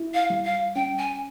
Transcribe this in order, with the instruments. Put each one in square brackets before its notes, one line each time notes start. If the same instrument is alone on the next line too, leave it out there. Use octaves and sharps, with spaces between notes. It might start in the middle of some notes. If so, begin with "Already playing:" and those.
Already playing: [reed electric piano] E4
[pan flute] F5
[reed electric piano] G3
[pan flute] F5
[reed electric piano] C#4 [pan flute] G5
[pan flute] G#5